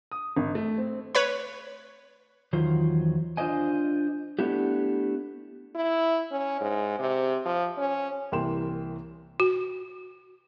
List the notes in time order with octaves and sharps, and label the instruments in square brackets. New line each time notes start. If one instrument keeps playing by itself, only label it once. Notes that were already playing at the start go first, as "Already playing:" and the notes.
[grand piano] D#6
G#1
A3
C4
[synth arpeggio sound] B4 C#5 B5
[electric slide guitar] E2 D#3 F#3 F4 C5
D4 F4 C5 D5 D#5 G#5
A3 B3 D4 E4 G4
[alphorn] E4
C#4
G#2
C3
F3
C#4
[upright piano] C2 E3 A#3 G5 C6 E7
[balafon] F#4